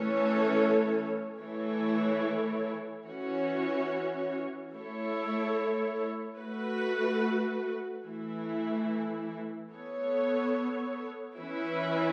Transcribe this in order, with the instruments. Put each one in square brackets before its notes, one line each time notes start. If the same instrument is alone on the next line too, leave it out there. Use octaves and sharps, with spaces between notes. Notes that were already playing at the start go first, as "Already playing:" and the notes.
Already playing: [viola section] E3 A3 C#4 A4 C#5
E3 A3 E4 A4 C#5
E3 C#4 F#4 C#5
A3 E4 A4 C#5
A3 F#4 B4
E3 A3 E4
B3 A4 C#5
E3 C#4 E4 B4